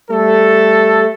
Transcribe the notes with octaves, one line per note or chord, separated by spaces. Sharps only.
G3 A3 A4